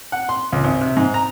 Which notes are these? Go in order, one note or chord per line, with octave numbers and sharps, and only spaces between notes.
F#5
C6
C#2
G#1
C3
G#2
A#5